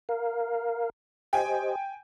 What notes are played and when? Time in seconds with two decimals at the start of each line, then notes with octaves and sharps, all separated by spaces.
0.09 A#4 F5
1.33 G4 C5 D#5 G5 G#5